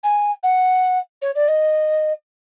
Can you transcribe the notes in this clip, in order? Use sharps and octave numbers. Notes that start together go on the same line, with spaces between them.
G#5
F#5
C#5
D5
D#5